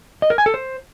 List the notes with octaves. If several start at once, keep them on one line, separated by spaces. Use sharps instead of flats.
D#5
A#4
G#5
A4
C5